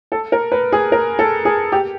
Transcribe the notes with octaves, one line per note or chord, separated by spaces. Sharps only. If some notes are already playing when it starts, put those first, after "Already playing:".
A4
A#4
B4
G#4
A#4
A4
G#4
G4